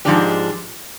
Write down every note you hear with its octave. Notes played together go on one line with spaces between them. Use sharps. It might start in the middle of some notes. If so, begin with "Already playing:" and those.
G#2 F3 G#3 D4 G4